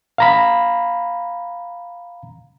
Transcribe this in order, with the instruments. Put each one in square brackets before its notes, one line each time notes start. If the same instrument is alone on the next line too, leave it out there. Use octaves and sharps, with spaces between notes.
[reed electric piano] F5 A#5 B5